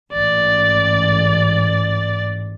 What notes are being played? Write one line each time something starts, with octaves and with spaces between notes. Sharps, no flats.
A1 G#2 D5